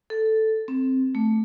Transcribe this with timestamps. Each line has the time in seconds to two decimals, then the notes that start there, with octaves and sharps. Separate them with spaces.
0.10 A4
0.68 C4
1.15 A3